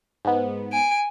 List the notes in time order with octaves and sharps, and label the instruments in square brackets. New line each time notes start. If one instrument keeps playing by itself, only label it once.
[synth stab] G#2 B3
[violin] G#5 D7